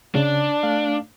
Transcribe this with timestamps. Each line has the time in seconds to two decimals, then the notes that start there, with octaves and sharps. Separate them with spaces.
0.15 C#3 D4
0.63 A3 F5